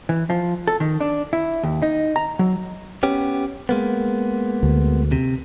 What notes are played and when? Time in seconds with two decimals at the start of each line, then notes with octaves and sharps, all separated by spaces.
0.09 E3
0.30 F3
0.68 A4
0.80 D#3
1.01 D4
1.33 E4
1.63 D#2
1.82 D#4
2.16 A#5
2.39 F#3
3.03 B3 C#4 G4
3.69 G#3 A#3 B3
4.63 D2
5.12 C3